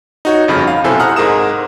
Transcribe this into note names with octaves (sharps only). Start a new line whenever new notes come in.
D#4 F#4 C#5
G1 F2 C#3 B5 F6
F5
B1 C3 E4 A4 C5 G#5
F#5 A#5 D#6 F6 F#6
G#2 G#3 A#4 A#5 D#6 E7